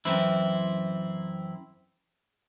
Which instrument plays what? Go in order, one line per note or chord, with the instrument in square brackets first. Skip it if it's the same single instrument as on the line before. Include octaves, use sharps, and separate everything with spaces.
[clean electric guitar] F#2 E3 C4 E4